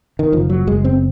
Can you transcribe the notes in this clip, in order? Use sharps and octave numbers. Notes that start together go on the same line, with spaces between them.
D#3
F#1 F3
F#3
F#1 G#3
C4